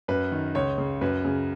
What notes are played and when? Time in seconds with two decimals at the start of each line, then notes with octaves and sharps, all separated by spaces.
0.08 F#2 B4
0.32 D#3
0.55 C#2 C#5
0.78 C#3
1.01 F#2 B4
1.25 C#3